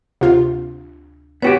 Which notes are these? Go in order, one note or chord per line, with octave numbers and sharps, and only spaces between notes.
D2 C3 F4
B3 F#4 G4 C#5 G5